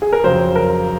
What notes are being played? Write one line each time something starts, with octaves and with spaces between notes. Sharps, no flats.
G#4
A#4
F2 C#3 F#3 C5
A#4